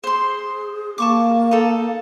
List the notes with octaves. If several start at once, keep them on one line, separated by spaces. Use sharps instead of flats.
G#4 C5 C6
A#3 A5 C#6 D6
D#4 A4